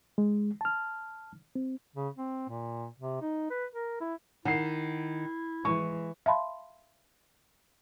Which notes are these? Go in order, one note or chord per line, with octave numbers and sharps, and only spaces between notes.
G#3
A5 F6
C4
C#3
C4
A#2
C3
D#4
B4
A#4
E4
D#3 E4 F#5 C7
E3 G#3 C#6
E5 F5 A5 B5 C6